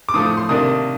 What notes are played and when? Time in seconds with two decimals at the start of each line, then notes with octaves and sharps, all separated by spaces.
0.09 D6
0.14 A2 F3 A3 D#6
0.26 D#6
0.37 C6
0.49 C3 D#3 A#3 D4 D#6